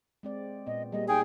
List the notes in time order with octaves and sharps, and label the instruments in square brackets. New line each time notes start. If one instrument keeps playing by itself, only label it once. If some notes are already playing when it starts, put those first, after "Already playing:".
[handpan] G#3 C4 D5
[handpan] A#2 B3 [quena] D#5
[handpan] G3 A#3 G#4 [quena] D#5
[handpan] D#4 D5 [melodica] G#4 [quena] G5